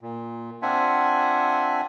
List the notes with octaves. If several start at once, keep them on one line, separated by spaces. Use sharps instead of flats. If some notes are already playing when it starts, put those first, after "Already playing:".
A#2
C4 D4 F4 E5 F#5 G#5